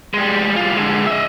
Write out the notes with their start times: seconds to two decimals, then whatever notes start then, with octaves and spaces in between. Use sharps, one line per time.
0.14 G3 G#3
0.56 G3 F4
0.76 D3 G#3
1.06 D#5 E5